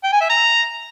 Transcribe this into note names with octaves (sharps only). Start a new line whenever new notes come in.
G5
G#5
E5
A#5